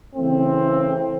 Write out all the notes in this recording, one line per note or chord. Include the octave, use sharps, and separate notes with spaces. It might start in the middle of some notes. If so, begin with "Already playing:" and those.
C#3 E3 A3 C4